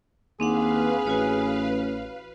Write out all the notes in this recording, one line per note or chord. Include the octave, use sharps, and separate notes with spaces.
D#2 C4 D4 G#4 B4 F5 F#5
A1 F#4 C#5